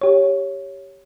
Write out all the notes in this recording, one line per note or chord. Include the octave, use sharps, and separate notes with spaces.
G4 C#5